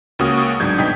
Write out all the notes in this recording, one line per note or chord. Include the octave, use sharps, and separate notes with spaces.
C#2 A#3 C#4 F#4 D#6
G1 G#2 F#3 D4 G6 G#6
B2 D#4 G5 G#6 B6